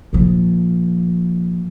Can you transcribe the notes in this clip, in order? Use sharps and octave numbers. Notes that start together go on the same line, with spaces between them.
A#2 F3